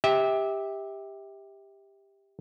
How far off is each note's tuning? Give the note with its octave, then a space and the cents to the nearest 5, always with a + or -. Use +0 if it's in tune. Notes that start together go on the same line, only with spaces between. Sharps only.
G4 +10 E5 -25